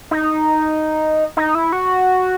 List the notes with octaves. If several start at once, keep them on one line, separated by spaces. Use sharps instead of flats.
D#4
D#4
E4
F#4